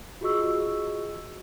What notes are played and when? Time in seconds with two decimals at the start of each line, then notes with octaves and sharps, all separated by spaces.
0.21 F4 F#4 G#4 D#5 C#6 E6